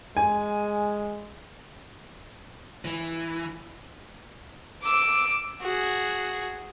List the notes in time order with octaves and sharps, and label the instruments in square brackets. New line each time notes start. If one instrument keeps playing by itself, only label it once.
[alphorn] G#3 [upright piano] G#5
[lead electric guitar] E3
[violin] D6 E6
F#4 G#4